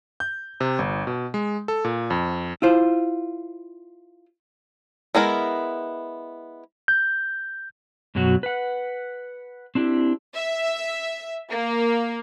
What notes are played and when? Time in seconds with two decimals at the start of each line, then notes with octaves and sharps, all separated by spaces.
0.20 G6
0.60 C3
0.79 G1
1.07 B2
1.34 G#3
1.68 A4
1.84 A#2
2.10 F2
2.62 E4 F4 C5
5.15 G#3 B3 E4 A#4
6.88 G6
8.15 F#2 B2 F#3 F#4
8.43 B4 F#5
9.75 C4 D4 E4 G4
10.34 E5
11.51 A#3